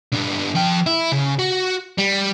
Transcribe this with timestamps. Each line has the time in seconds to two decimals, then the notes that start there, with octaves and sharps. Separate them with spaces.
0.12 D3 B3
0.55 F3 G5
0.86 E4
1.12 C#3
1.39 F#4
1.98 G3